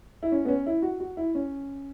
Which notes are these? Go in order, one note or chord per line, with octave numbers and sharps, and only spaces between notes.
E4
C#4
B3
C#4
E4
F#4
F#4
E4
C#4